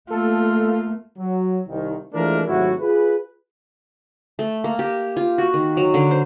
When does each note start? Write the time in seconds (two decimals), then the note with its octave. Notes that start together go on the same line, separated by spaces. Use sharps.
0.10 A3 A#3 F4 A4
1.18 F#3
1.68 C2 D#3
2.14 E3 F3 G#3 A3 D4 A#4
2.47 G#1 C3 F#3 A3 E4 F#4
2.80 F4 G#4 B4
4.39 A3
4.64 A#3
4.79 G4
5.17 F4
5.38 F#4
5.54 D#3
5.77 F#3
5.94 D3
6.11 C5